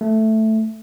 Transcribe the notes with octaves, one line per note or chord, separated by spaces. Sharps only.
A3